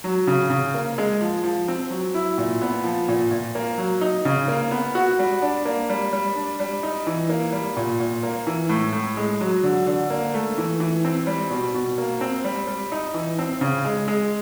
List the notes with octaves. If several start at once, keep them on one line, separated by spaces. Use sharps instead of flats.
F#3
C#3
C#3
A#3
G#3
F3
F3
C4
F#3
E4
A#2
B3
F3
A#2
A#2
A#3
F#3
D#4
C#3
A#3
B3
F#4
G3
D4
A#3
G3
G3
D4
G3
D#4
E3
A#3
G3
A#2
A#2
A#3
E3
A2
A2
G#3
F#3
D3
D3
A#3
A3
E3
E3
C4
G3
B2
B2
A#3
C4
G3
G3
D#4
E3
C4
C#3
G#3
G#3